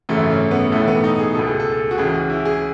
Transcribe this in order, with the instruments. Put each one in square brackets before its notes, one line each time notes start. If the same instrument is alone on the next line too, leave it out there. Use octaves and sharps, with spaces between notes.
[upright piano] G#1 F#2 C#3 E3 A3
C#4
B3
B1 A2 E3 A3
B3
D#4
G#4
C#2 B2 A4
G#4
A4
F#4
C#2 C#3 E3 G#4
F#4
E4
G#4